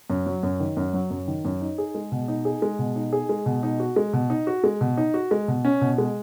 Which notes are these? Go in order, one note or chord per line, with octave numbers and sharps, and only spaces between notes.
F#2
F#3
F#2
D#3
F#2
F#3
F#2
D#3
F#2
D#4
G#4
G#3
B2
D#4
G#4
G#3
B2
D#4
G#4
G#3
B2
D#4
F#4
G#3
B2
D#4
F#4
G#3
B2
D#4
F#4
G#3
B2
C#4
B2
G#3